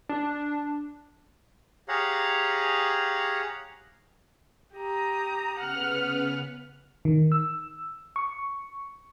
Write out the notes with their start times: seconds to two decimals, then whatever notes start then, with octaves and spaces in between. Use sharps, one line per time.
0.09 D4
1.88 G4 G#4 C#5 F5 F#5 A#5
4.75 G4 A#5 D#6
5.59 C#3 B3 B4 F#5 F6
7.05 D#3
7.32 E6
8.16 C#6